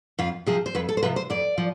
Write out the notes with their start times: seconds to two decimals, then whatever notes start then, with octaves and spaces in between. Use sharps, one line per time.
0.19 F2 F4
0.46 C3 F3 G#4
0.66 C5
0.75 F2 B4
0.89 A4
0.97 C5
1.03 C3 F3 B4
1.16 C5
1.30 F2 D5
1.58 F3